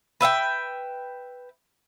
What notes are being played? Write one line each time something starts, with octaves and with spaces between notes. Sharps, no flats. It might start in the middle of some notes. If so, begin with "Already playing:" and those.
B4 E5 F5 G5